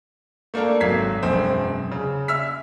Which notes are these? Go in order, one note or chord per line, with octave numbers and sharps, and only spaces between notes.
A3 A#3 D4 A4 A#4
G#1 F#3 G#6 B6 C7
E1 F#2 C4
C#3
E5 E6 F6 B6